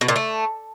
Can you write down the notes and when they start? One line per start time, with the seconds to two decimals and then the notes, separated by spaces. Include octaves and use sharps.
0.01 B2
0.08 A#2
0.16 A3